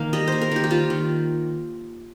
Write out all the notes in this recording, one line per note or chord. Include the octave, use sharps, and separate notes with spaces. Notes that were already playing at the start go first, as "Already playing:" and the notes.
Already playing: D#3 A#3 F5
G3 D#5
A#3 C5
A#4
D#3 G4
G4
G3 F4
D#3